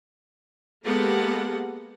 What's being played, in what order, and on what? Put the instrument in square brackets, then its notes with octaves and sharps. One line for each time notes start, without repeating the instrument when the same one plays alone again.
[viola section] G#3 A#3 B3 G4 A4 F#5